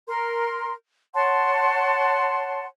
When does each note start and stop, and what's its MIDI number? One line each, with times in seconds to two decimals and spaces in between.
0.07 0.72 70
0.07 0.72 84
1.14 2.65 73
1.14 2.65 78
1.14 2.65 81
1.14 2.65 84